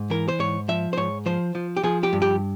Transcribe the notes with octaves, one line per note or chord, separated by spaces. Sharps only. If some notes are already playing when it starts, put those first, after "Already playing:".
Already playing: G#2
E3 A#4
C5
G#2 C#5
F3 E5
C5
G#2 C#5
F3 C5
F3
G4
F3 G#4
G4
G2
G4